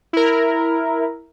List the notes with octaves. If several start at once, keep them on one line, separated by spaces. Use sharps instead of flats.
E4 A#4